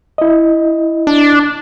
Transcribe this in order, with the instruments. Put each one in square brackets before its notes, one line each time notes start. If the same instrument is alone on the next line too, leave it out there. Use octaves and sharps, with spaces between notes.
[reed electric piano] E4 D#5
[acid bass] D4